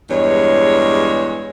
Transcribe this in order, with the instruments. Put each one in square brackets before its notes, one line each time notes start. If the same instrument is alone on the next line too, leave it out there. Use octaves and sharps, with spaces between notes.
[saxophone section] E2 G2 G#3 C#5